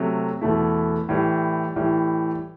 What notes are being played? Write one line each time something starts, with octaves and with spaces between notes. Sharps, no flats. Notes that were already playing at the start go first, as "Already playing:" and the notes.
Already playing: C3 F#3 A3
E2 B2 A3 E4
A2 E3 G3
A2 E3 G3